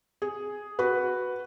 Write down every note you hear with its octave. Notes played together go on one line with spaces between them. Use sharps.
G#4
F#4 B4